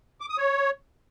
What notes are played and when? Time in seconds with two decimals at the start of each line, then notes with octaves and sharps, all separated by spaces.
0.21 D6
0.29 D#6
0.38 C#5